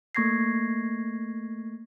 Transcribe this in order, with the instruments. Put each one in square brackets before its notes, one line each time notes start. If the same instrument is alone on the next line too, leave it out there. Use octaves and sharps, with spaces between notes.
[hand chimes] A3 A#3 C#6 G#6 A#6 C7